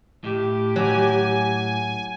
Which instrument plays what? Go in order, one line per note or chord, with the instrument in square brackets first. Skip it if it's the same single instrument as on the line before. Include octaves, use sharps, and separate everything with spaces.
[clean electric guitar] A2 [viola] G4
[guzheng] F#3 [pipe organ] G#5